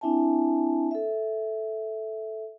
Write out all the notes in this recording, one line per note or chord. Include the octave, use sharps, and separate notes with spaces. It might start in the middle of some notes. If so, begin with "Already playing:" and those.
C4 D4 E4 E5 G#5 A5
A4 E5